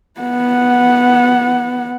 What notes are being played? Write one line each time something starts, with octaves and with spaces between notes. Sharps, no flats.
B3 F#5